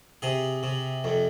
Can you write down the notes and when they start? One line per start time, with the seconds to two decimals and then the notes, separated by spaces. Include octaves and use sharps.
0.22 C3 G#4
0.63 C3
1.04 F2